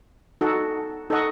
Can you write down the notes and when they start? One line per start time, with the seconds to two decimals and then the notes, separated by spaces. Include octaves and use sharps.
0.41 D#4 F#4 A4
1.10 D#4 A4 D#5 F#5 C#6